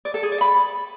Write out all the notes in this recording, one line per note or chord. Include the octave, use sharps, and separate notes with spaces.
D5
A4
G#4
D5
B5